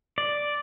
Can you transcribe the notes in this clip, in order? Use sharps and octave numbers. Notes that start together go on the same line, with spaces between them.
D5